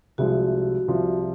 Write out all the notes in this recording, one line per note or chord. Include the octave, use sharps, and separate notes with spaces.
C2 C3 F3 G#3 F#4
C2 C3 F3